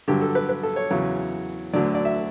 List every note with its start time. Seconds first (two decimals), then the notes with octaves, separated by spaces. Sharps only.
0.08 G2 D3 F#3 G4
0.21 A4
0.35 B4
0.49 B4
0.63 A4
0.76 C#5
0.91 E2 C#3 F#3
1.73 D2 D3 F#3 D5
1.95 D5
2.05 E5